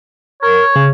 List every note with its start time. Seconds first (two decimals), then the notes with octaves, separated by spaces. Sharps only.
0.42 A#4 C#5
0.76 C#3